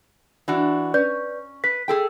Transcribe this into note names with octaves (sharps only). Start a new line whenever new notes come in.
E3 D4 F#4
C#4 B4 D5 G6
B4 B6
G#4 A4 G5